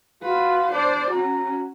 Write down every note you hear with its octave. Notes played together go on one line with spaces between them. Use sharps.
F4 F#4 B4
D4 C5 D5
C#4 F#4 A#5